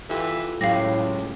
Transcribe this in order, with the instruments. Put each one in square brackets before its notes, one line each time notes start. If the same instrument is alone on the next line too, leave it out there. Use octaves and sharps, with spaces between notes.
[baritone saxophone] E3 [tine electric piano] F4 G4 A4
[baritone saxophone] C#2 [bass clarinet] A2 [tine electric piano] F#3 A3 G4 [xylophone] F5 A#6